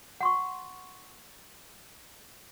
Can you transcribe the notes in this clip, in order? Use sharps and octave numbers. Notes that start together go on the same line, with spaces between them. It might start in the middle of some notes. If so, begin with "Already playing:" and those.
F#5 C6 C#6